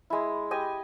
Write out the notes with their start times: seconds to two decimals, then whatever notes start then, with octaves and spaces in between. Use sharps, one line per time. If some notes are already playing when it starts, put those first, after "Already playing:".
0.10 G#3 E4
0.51 G4 D#5 G#5